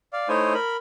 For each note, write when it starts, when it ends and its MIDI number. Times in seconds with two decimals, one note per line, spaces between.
0.13 0.28 74
0.13 0.28 77
0.29 0.54 57
0.29 0.54 63
0.29 0.54 64
0.29 0.54 72
0.29 0.54 73
0.29 0.54 80
0.54 0.77 70
0.54 0.77 83